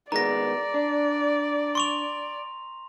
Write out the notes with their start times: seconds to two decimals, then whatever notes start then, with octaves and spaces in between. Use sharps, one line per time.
0.12 D#3 G#3 B3 D5 A#5 A#6
0.74 D4
1.75 C6 C#6 F7